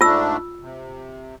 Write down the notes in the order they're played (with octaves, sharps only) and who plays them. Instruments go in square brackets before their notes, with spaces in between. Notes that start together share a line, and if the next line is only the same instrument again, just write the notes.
[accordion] G#2 A3 D4 [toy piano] F4 E6
[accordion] C3